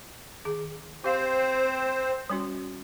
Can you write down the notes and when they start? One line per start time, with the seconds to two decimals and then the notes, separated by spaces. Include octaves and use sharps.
0.45 D#3 G#4
1.04 C4 G4 C5 F5
2.30 G3 C#4 F#4